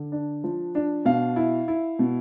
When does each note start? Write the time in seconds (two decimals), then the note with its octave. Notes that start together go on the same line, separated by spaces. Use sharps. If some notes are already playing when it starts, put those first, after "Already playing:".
Already playing: D3
0.12 D4
0.44 F3
0.75 D4
1.05 B2 F5
1.36 E4
1.68 E4
1.99 B2